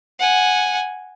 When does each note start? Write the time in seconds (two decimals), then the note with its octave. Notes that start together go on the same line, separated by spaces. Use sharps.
0.20 F#5 G#5